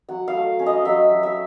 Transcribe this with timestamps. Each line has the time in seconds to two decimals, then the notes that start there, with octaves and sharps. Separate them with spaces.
0.09 F#3 F#5
0.28 F5
0.34 A3
0.59 C#4
0.66 D#5
0.85 F#3 E5
1.11 F#3
1.23 E5